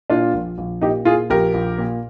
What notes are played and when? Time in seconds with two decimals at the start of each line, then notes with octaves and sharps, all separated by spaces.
0.10 A#2 D4 F4
0.34 A#1
0.58 A#1
0.81 A#2 D#4 G4
1.05 A#2 F4 G#4
1.30 A#1 G4 A#4
1.54 A#1
1.78 A#2